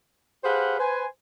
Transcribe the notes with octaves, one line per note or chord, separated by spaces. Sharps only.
G4 G#4 B4 C5 F5 F#5
B4 C5 G#5